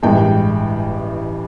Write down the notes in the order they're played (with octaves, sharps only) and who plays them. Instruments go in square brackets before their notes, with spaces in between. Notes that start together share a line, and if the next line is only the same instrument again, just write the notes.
[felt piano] A1 G2 E3 G#3 G5